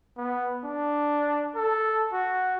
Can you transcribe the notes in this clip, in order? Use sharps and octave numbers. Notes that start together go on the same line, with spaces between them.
B3
D4
A4
F#4